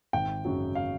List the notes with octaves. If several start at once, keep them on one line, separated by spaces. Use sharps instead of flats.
G#1 G5
F#2 C#3 F#3
F5